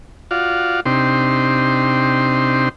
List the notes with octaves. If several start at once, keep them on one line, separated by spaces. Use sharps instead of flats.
F4 F#4 D5 F5
C3 C4 D4 D#4 G4 C6